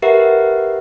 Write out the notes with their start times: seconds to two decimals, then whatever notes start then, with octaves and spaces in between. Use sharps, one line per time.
0.02 G4 A#4 B4 E5 F#5